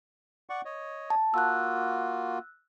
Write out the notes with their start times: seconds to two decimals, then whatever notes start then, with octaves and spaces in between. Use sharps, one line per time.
0.49 D5 F#5 C#6
0.65 C#5 D#5
1.10 A5
1.34 A#3 F4 F#4 E6 F#6